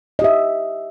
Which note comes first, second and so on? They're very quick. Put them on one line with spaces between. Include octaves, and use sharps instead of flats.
D#5 G4 E5